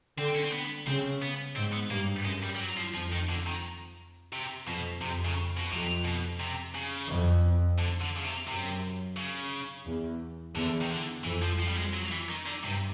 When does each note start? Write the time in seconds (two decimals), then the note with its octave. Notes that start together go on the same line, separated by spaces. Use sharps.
0.18 D3 C4
0.35 C#4
0.44 C4
0.52 B3
0.87 C#3 C4
1.22 B3
1.56 G#2 C4
1.73 B3
1.90 G2 A#3
2.25 F#2 G#3
2.43 G3
2.55 G3
2.60 F#3
2.77 F3
2.94 F2 F3
3.12 D#3
3.29 D3
3.47 D#3
4.33 C3
4.67 F2 B2
5.02 F2 C3
5.25 C#3
5.57 B2
5.71 F2 C3
6.05 B2
6.40 C3
6.75 C#3
7.10 F2
7.79 D3
8.01 D3
8.17 C#3
8.24 C3
8.48 F#2 C3
9.17 C#3
9.86 E2
10.55 E2 D3
10.81 D#3
10.90 D3
11.24 F2 E3
11.42 F3
11.59 F3
11.68 G3
11.76 G#3
11.93 F#3
12.11 E3
12.28 D#3
12.46 D3
12.63 G2 C3